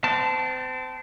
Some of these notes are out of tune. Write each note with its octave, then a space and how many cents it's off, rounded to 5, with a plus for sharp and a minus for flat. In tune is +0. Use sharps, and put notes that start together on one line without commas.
C4 -35 A5 +0